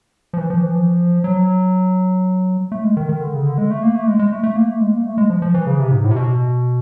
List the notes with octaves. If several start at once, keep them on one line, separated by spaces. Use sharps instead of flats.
F3
E3
F3
E3
F3
F#3
A3
G#3
D#3
D#3
D3
C#3
D3
G#3
A3
A#3
A3
G#3
G#3
A3
A3
A#3
A3
G#3
A#3
A3
G#3
F3
F3
E3
C#3
C3
G#2
A2
C3
B2